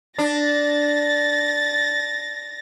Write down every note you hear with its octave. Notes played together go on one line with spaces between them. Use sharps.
D4 A6 A#6